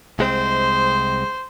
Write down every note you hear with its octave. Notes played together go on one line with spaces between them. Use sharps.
C2 G#3 C4 C5